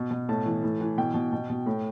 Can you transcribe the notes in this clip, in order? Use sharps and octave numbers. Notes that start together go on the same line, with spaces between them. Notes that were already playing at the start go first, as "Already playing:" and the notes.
Already playing: B2
B2
A2 A5
E3
A2
E3
B2 G5
B2
B2
B2
A2